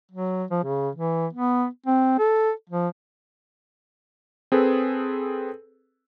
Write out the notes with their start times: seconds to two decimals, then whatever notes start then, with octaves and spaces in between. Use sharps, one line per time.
0.11 F#3
0.51 F3
0.64 C#3
0.96 E3
1.33 B3
1.86 C4
2.19 A4
2.70 F3
4.52 C4 G#4 A4 B4